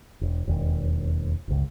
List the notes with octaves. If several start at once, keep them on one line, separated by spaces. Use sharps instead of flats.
E1
E1 D#2
G1 C#2